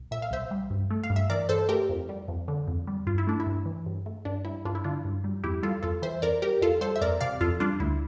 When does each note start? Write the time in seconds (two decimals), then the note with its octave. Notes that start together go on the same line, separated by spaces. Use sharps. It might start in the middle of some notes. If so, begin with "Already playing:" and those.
Already playing: C2
0.11 A#2 E5
0.22 F5
0.31 C2 C5 E5
0.51 G3
0.70 G2
0.91 A3
1.04 F5
1.10 G2
1.16 E5
1.30 E3 A#4 D5
1.49 G2 A4 C5
1.69 A3 G4 A#4
1.89 F2
2.09 G3
2.28 F2
2.48 D3
2.68 F2
2.87 G3
3.07 G2 F4
3.18 E4
3.27 A3 D4
3.40 E4
3.47 G2
3.66 E3
3.86 G2
4.06 A3
4.25 G2 D4
4.45 G3 E4
4.65 G2 D4 F4
4.75 E4
4.84 D3 D4 F4
5.05 G2
5.24 G3
5.44 F2 E4 G4
5.63 G3 F4 A4
5.83 F2 F4 A4
6.02 E3 C5 E5
6.22 F2 A#4 D5
6.42 G3 G4 A#4
6.61 F2 F4 A4
6.81 G3 A4 C5
6.96 E5
7.01 F2 A#4 D5
7.21 C3 D5 F5
7.41 F2 F4 A4
7.60 G3 D4 F4
7.80 D2 E4